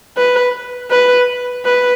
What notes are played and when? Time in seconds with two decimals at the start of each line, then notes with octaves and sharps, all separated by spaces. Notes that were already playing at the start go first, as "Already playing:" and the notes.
0.17 B4
0.91 B4
1.65 B4